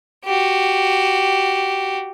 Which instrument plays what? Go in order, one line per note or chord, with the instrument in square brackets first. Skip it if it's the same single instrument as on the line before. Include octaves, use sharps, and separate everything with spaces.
[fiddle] F#4 G4